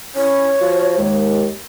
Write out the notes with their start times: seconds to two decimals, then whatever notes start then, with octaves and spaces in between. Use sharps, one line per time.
0.15 C#4 E4 C#5
0.60 F3 F4 F#4
0.97 D#2 G#3